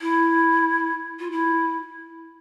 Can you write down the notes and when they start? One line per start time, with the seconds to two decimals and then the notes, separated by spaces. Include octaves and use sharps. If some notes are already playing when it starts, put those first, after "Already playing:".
0.01 E4
1.20 F4
1.31 E4